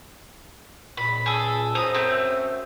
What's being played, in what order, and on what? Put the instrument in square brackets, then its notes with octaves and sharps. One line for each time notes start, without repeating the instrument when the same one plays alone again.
[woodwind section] C#2 A#2 [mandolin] B5
[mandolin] G#4 A4
[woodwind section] F#2 C5 [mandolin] A#5 D#6
[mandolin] A3 C4